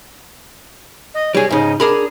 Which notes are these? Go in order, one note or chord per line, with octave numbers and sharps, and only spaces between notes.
D#5
G3 G#4 C#5
G#2 C#3 D#4
D4 G#4 A#4 B5